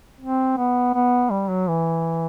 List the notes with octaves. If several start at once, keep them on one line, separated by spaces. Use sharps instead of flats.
C4
B3
B3
G3
F#3
E3